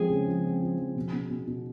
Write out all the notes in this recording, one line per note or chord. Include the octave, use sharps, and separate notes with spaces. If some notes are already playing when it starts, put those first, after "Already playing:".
Already playing: F3 G#3 C4 G#4
C#3
F3
C4
F3
F3
B2
B2
B2
B2